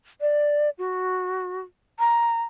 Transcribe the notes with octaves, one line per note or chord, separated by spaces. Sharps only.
D5
F#4
A#5